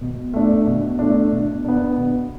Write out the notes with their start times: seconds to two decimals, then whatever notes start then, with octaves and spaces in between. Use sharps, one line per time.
0.01 B2
0.34 A3 D4
0.67 B2
0.99 A3 D4
1.32 B2
1.65 B3 D4
1.97 B2